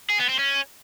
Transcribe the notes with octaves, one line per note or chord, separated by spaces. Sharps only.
G#4
B3
C4
C#4